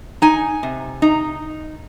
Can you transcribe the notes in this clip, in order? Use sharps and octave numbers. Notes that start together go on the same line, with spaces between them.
D#4 G#5
C3
D#4